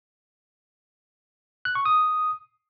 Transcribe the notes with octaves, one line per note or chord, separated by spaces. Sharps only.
F#6
C#6
D#6